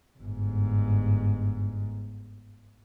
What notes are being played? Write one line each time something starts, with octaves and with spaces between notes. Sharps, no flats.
G1 G#2